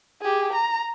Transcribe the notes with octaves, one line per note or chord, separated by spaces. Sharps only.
G4 G#4
A#5